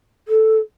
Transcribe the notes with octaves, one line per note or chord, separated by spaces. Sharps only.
A4